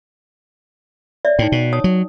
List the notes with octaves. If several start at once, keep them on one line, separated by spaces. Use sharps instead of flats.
C#5 D5 E5
A2 D#4 G5
B2
C#5 A5 D#6
F#3